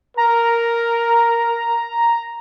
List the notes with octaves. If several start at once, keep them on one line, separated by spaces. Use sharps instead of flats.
A#4 A#5